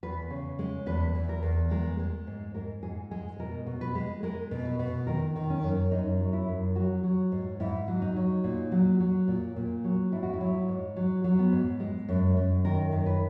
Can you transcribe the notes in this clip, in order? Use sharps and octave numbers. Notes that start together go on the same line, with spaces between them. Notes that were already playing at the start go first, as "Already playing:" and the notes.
E2 B4
C#3
G#3
E2 B4
E2
A#4
E2
G#3 A#4
G#3
G#2
G#2 A#4
G#2 G#4
G#3 G#4
B2 A#4
B2
B4
G#3
G#3 A#4
B2
B4
B2
D#3 A#4
D#3
C#4
F#2
F#2 D#4
F#3
E4
F#2
F#3 F#4
F#3
G#2
G#2 E4
F#3
D#4
F#3
A#2
F#3
F#3
A#2
A#2
F#3
G#2 E4
F#4
E4
F#3
G#2
F#3
F#3
B3
G#2
G#3
F#2
F#2
D#3 A#4
F#2
B4